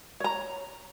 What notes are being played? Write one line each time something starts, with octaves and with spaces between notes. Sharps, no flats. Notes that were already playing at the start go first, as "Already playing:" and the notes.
C#5 A#5